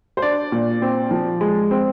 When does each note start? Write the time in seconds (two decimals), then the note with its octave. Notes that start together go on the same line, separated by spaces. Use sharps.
0.17 C5
0.22 D4 D5
0.52 A#2
0.82 C4
1.11 F3
1.41 G#3
1.71 C4